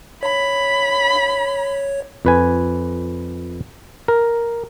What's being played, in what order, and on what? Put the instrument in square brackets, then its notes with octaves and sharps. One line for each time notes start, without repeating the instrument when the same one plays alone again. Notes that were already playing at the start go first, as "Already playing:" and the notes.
[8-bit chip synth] C#5 [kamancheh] B5
[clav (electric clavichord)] F2 B4 G#5
A#4